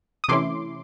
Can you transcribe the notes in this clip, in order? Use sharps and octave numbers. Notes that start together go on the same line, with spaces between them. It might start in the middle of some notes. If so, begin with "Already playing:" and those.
D#6
C3 E3 A3 C#4 E4 C6 D6